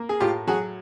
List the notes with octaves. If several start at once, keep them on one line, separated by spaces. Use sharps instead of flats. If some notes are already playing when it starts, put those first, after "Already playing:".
Already playing: A#3
G#4
A2 F4 G4
F#3 F#4 G#4